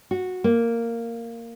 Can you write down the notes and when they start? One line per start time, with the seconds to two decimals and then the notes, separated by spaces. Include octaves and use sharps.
0.11 F#4
0.44 A#3